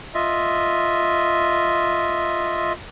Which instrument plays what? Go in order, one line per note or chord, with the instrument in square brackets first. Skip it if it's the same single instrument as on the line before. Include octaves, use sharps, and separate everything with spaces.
[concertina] F4 D#5 E5